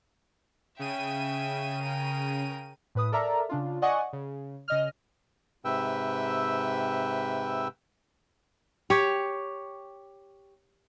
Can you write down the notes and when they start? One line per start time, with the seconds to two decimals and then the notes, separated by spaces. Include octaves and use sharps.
0.79 C#3 E5 G5 D#7
1.82 A#4 G5
2.95 A2 B4 D#6
3.12 A4 A#4 D5 E5 A#5
3.49 C#3 D4 F4
3.82 D5 D#5 F#5 G#5 C#6 D#6
4.13 C#3
4.68 C#3 D#5 F6
5.65 G#2 C3 B4 E5 G5 E6
8.90 G4 C#5